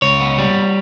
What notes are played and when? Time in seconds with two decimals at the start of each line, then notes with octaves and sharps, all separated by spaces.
0.02 C#2 C#5
0.20 B3
0.38 G3